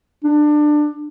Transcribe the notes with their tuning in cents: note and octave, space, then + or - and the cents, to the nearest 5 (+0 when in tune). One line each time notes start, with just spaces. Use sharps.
D4 +20